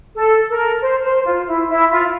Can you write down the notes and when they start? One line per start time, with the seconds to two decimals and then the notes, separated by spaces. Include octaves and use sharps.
0.16 A4
0.50 A#4
0.82 C5
1.04 C5
1.25 F4
1.47 E4
1.69 E4
1.91 F4